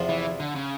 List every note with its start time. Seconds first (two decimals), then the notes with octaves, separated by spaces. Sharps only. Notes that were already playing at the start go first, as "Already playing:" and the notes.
Already playing: E2 C3 F3
0.09 E3
0.40 D3
0.55 C#3